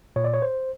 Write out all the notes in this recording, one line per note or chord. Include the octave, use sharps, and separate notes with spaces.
A#2 C#5
D5
C#5
C5